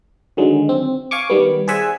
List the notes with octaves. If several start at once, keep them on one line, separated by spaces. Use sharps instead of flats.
D3 D#3 F#3 G#3
C4
F5 G#5 C#6 D6
D#3 G3 B3
G#4 C5 D5 E5 F#5 G#5